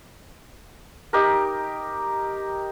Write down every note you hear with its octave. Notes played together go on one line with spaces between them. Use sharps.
D#4 G4 A#4